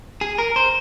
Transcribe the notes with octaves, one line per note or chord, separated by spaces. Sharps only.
G#4
A#4
C5